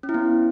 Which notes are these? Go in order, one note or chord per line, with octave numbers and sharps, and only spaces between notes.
C#4
E4
B3